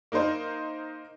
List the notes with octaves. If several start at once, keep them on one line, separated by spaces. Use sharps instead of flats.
A#3 D#4 A#4 C5 D#5